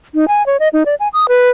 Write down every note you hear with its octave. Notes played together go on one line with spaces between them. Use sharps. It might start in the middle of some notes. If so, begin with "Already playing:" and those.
D#4
G#5
C#5
D#5
D#4
D5
G#5
D#6
B4